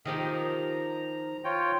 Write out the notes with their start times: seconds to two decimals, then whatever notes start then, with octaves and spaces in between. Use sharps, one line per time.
0.06 D#3 F3 G4 D#5
0.33 A#5
1.44 F4 C#5 G5